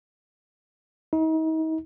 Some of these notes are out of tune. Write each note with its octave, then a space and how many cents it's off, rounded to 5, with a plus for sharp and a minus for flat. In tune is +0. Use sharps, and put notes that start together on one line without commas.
D#4 +40